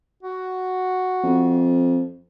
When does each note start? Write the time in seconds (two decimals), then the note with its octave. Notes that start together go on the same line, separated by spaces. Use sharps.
0.23 F#4
1.23 F2